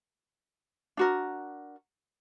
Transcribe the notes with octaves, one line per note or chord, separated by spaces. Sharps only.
D4 F#4 A#4